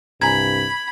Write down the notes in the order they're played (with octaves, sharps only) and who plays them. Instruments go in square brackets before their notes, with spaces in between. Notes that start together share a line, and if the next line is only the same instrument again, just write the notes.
[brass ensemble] C2 G2 [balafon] G#5 A#5 [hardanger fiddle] B5 [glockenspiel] G#6